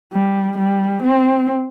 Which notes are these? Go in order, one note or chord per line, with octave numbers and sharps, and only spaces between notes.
G3
G3
C4